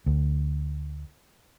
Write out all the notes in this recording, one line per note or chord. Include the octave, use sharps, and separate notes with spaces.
D2